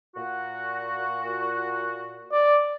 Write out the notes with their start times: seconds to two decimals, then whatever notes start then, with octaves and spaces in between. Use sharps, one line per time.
0.16 A#2 F#4
2.31 D5